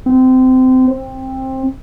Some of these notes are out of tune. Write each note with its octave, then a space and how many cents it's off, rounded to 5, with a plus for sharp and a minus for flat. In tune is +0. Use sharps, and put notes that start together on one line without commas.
C4 -25
C4 +15